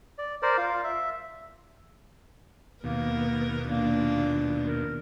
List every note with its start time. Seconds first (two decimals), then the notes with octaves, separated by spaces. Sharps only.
0.18 D5
0.42 A#4 C5 D5
0.58 F4 F5
0.84 E5
2.84 D#2 B2 A#3 B3 A#4
3.70 A#2 A#3 D4
4.68 A#4